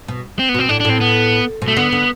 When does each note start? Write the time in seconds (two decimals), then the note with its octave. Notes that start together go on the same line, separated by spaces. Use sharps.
0.08 B2
0.39 C4
0.49 B3
0.54 B2 C4
0.69 A2 D4
0.80 D4
0.85 A2 C4
1.01 B3
1.62 B2
1.68 A3
1.76 D3 B3
1.92 D3